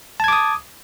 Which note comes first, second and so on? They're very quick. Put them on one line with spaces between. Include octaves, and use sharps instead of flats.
A5 G#6 D6 D#6